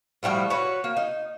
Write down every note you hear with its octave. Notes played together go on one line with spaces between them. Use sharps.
A2 F3 G3 F#4
F#4 B4 C#5
A#3
D#4